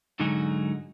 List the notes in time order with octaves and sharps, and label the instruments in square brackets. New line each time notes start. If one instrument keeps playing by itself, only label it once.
[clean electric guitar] G#2 D3 F#3 D#4 F#4 G#4